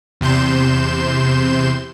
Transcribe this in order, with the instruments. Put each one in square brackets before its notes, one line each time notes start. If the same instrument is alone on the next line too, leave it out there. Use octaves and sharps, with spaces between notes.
[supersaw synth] E2 C3 C6 G6 E7